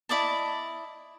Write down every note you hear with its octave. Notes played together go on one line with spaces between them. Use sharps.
E4 D5 D#5 A5